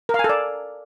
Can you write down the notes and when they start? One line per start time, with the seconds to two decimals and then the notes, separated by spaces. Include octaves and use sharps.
0.09 A#4
0.14 F5
0.19 G#5
0.24 A4
0.29 D5